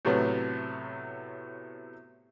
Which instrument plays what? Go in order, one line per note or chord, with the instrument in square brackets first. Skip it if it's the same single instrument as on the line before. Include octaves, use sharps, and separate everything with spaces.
[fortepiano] A2 C3 F#3 A3 B3